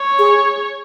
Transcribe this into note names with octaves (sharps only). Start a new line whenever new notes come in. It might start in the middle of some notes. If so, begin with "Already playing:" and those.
Already playing: C#5
G#4